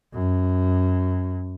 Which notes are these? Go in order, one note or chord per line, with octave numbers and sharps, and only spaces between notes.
F#2